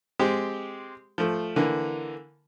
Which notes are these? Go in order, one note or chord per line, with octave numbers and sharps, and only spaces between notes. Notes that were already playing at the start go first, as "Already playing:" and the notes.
G#3 C4 G4
F3 A3
D3 E3 A#3